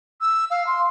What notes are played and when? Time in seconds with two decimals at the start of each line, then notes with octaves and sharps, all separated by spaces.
0.21 E6
0.50 F5
0.66 C6